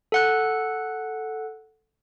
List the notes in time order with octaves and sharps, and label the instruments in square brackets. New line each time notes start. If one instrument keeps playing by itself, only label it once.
[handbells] A4 F#5 F#6